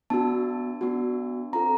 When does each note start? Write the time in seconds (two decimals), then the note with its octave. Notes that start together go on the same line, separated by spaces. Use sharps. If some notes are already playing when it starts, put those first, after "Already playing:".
0.10 B3 D4 F#4 A5
0.81 B3 D4 F#4
1.53 C4 F4 A4 A#5